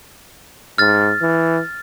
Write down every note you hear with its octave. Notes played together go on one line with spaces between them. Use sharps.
G#2 F6 A6
E3